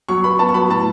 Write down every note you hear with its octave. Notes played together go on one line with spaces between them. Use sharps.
F#3 C#6
B3 B5
B3 A5
C#6
F#3 B5
A2 A5